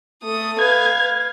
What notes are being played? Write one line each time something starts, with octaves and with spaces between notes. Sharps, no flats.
A3 D#6
B4 F5 G#6